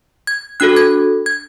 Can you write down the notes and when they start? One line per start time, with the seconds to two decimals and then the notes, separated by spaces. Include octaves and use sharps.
0.27 G#6
0.60 D4 F#4 A4 F#6
0.77 G#6
1.26 G#6